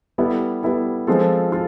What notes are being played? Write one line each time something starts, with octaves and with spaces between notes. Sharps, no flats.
G3 B3 E4 A4
G3 B3 E4 A4
F3 G#3 C4 F4 A4
F4 A4